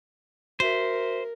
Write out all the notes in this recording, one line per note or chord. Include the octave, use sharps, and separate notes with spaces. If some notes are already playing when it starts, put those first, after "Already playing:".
F#4 A#4 C5 E5 B6